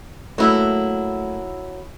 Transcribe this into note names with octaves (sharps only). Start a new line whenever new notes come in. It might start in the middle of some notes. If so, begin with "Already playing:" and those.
F#3 A3 A#3 E4 B4